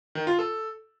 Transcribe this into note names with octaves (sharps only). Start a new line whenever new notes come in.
D#3
F4
A4